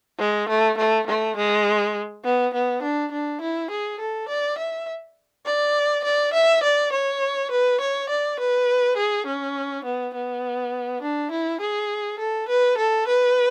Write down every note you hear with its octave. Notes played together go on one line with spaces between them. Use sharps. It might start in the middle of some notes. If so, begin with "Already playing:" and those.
G#3
A3
A3
A3
G#3
B3
B3
D4
D4
E4
G#4
A4
D5
E5
D5
D5
E5
D5
C#5
B4
C#5
D5
B4
G#4
C#4
B3
B3
D4
E4
G#4
A4
B4
A4
B4